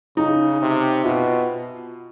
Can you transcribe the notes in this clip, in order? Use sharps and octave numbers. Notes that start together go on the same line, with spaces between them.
C#3 D#4
C3
B2 F4